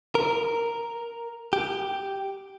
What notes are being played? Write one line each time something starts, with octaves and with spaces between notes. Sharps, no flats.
A#4
G4